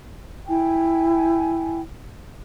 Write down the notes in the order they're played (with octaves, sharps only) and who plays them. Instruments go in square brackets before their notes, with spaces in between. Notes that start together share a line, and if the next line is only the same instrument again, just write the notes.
[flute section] E4 G5 G#5